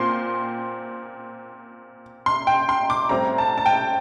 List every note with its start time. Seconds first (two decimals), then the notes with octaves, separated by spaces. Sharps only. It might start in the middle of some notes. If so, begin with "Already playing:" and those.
Already playing: A#2 C4 C6
2.26 C6
2.47 G5
2.69 C6
2.90 D6
3.09 A2 G3 C4 A#5
3.38 A5
3.58 A5
3.66 G5